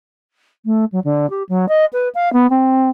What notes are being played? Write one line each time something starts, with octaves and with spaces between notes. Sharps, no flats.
A3
F#3
D3
G4
F#3
D#5
B4
F5
B3
C4